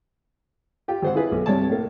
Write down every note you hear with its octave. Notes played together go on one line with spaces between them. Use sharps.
F4 G4 G5
G#1 C5 F#5
E4 F4 G#4 B4
B1
G2 C3 C#5 D5 A5
A2 A#3